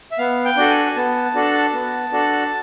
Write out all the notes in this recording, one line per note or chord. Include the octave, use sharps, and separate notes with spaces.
E5
B3 F5
G5
D4 F#4 A4
G#5
B3 A5
D4 F#4 A4
B3
D4 F#4 A4